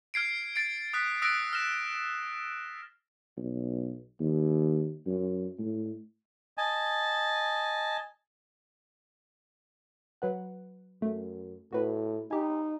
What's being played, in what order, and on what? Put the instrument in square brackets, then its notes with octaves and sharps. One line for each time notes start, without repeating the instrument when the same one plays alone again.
[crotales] F6 G#6 C7 D7
A6 C7 D7
D#6 F#6 B6
D#6 E6 F#6 A#6 D7
F6 A#6 E7
[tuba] B1
D#2
F#2
A2
[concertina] D#5 G#5 A5
[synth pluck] F#3 B4 F#5
[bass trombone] F#2 [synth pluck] A3
[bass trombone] A2 [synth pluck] F#4 B4
[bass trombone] D#4 [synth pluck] G4 G#5